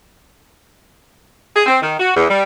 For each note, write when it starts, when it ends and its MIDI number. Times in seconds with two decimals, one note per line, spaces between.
1.54 1.65 68
1.66 1.79 60
1.82 1.94 51
1.99 2.11 66
2.14 2.25 40
2.29 2.43 55